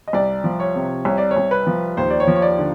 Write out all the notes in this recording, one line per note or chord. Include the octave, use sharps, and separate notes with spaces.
D#5
C2 D5
F3
C#5
C3
C2 C#5
D5
C#5
C2
B4
F3
D#2 C5
D5
C#5
F3
C#5
D5
D3